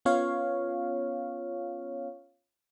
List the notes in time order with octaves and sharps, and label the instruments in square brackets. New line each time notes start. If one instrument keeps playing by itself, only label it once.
[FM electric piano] B3 C#4 F4 C#5 F5